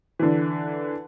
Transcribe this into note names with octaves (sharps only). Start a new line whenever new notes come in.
D3 E3